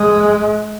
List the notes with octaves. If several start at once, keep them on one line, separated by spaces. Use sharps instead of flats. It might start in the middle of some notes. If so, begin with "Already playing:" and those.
Already playing: G#3